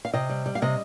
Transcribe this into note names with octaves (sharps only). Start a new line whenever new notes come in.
F5
C3 D#5
G3
G3
F5
C3 D#5